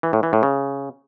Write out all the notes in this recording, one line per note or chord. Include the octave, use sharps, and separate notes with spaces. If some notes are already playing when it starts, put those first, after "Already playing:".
E3
A2
E3
A2
C#3